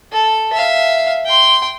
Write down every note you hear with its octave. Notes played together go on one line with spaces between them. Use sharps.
A4
E5 F5
G5 C6